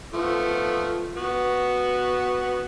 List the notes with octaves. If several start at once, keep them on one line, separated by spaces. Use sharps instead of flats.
F3 A3 B3
B3 F#4